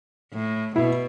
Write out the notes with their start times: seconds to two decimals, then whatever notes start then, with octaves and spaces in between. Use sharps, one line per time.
0.33 A2
0.76 B2 E4